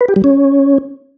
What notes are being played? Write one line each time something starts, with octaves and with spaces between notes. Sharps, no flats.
B4
G4
G3
C#4